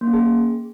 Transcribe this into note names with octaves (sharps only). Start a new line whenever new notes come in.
A#3
C#4
G#4